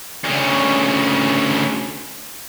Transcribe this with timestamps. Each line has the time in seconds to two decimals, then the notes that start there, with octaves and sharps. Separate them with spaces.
0.24 D2 C#3